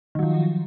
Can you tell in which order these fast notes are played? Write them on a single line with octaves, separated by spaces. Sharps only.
D#3 F#3 F3